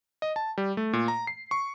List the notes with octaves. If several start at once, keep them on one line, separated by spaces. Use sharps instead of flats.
D#5
A5
G3
A3
A#2
A#5
C7
C#6